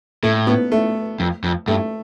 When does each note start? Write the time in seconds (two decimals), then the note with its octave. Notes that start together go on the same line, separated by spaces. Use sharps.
0.23 A2 A3
0.47 B3
0.72 A3
1.20 F2
1.44 F2
1.68 G2 A3